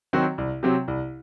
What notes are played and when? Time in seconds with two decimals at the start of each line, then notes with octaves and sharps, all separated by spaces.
0.13 D#3 F#3 C4 F#4
0.38 C2
0.63 C3 F#3 C4
0.88 C2